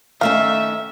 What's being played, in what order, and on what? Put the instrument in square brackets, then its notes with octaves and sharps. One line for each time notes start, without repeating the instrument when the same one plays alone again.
[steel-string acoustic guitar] D#3 A3 C#4 [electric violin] E5 [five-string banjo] F5